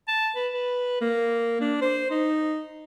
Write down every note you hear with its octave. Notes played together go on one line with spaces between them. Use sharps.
A5
B4
B4
A#3
D4
C5
D#4